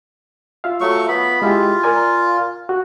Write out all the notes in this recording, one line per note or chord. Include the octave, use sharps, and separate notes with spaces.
F4 E5 F5
F#3 A3 C#6
B3 B5
G#3 E4 F4 G4
A#4 D5 G#5
F#4